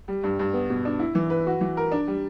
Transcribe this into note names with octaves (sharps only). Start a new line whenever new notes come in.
G3
G2
G2
B3
B2
D4
E4
E3
B4
F#4
E3
A#4
D4
G3